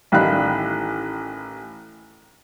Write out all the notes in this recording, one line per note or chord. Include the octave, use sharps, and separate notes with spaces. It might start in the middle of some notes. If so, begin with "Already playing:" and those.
A1 A2 D#3 F5 B5 F#6